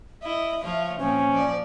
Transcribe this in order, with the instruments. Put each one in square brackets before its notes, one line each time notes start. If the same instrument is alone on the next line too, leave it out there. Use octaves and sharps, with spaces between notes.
[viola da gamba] E4 D#5 [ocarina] E5
[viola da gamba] F3 F4 C#5
[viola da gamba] A#2 F3 C4 [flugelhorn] C#4 [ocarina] C5
[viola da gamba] F3 D5